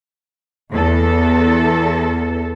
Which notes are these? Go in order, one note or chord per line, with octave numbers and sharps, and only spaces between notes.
E2 A4